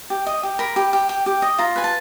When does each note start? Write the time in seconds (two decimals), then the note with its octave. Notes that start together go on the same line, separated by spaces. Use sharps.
0.10 G4
0.27 D#5
0.43 G4
0.59 A#4 B5
0.76 G4
0.93 G4
1.09 G4
1.26 G4
1.42 D#5
1.58 F4 A#5
1.76 B4 G#5
1.84 A5